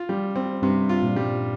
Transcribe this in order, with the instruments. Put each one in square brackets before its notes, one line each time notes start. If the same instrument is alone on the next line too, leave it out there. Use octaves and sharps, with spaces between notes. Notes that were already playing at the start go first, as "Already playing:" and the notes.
Already playing: [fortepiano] F4
G3
C4
[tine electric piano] G2 [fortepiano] C3
[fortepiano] F4
[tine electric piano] A#2
[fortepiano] G3